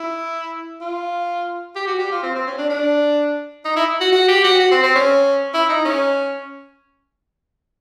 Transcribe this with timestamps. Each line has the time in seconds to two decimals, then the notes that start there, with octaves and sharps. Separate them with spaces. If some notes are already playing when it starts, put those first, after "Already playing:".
Already playing: E4
0.81 F4
1.75 G4
1.87 F#4
1.99 G4
2.12 F4
2.23 C4
2.35 C4
2.47 C#4
2.58 D4
2.70 D4
3.65 D#4
3.76 E4
4.01 F#4
4.12 F#4
4.28 G4
4.44 F#4
4.60 F#4
4.71 C4
4.83 C4
4.95 C#4
5.54 E4
5.69 D#4
5.85 C#4